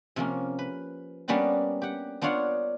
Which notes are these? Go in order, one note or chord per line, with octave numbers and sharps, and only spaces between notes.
C3 F3 A#3 C#4
B4
G3 A#3 B3 C#4 D4 B4
G4 F#5
B3 D4 F4 C#5 F5 F#5